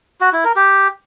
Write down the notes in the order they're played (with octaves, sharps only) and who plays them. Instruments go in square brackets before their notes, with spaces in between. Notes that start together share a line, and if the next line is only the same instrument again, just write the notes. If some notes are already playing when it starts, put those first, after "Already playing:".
[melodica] F#4
E4
A#4
G4